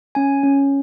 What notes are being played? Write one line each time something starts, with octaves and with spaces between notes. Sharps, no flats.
C#4 G#5
C#4